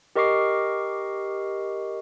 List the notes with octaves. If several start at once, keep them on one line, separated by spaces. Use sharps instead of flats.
G4 A#4 D#5 C#6 D6 C7